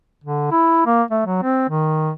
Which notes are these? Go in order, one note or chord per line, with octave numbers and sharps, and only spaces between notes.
D3
E4
A#3
A3
F#3
C4
D#3